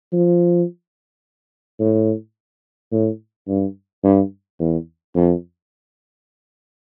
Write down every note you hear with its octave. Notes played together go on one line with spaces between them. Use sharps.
F3
A2
A2
G2
G2
E2
F2